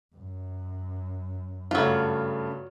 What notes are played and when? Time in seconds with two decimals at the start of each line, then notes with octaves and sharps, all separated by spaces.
0.15 F#2
1.71 G2 C#3 F#3 A3 F4